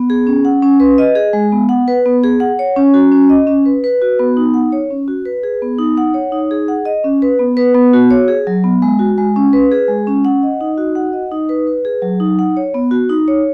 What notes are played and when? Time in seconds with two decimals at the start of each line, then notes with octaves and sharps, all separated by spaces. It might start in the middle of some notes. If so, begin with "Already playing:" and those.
Already playing: B3
0.10 G#4
0.27 C#4
0.45 F#5
0.62 C#4
0.80 B4
0.98 D#5
1.15 G#4
1.33 G#3
1.52 B3
1.69 F#5
1.88 B4
2.06 B3
2.24 G#4
2.40 F#5
2.59 C#5
2.76 C#4
2.94 F#4
3.12 C#4
3.30 D#5
3.47 C#4
3.66 B4
3.84 B4
4.02 F#4
4.19 B3
4.37 D#4
4.54 F#5
4.72 C#5
4.90 C#4
5.08 F#4
5.26 B4
5.44 G#4
5.62 B3
5.79 D#4
5.98 F#5
6.14 C#5
6.32 D#4
6.51 G#4
6.68 F#5
6.85 D#5
7.04 C#4
7.22 B4
7.39 B3
7.57 B4
7.75 B3
7.94 F#4
8.11 C#5
8.28 G#4
8.47 F#3
8.64 B3
8.82 G#3
8.99 F#4
9.18 G#3
9.36 C#4
9.53 B4
9.71 G#4
9.88 G#3
10.07 C#4
10.25 F#5
10.43 D#5
10.61 D#4
10.78 F#4
10.95 F#5
11.13 D#5
11.32 D#4
11.49 B4
11.67 B4
11.85 G#4
12.02 F#3
12.20 D#4
12.39 F#5
12.57 C#5
12.74 B3
12.91 F#4
13.09 D#4
13.28 C#5